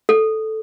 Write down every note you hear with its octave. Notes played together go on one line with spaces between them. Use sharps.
A4